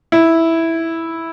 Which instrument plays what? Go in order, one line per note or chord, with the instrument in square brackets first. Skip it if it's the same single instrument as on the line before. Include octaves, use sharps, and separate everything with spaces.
[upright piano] E4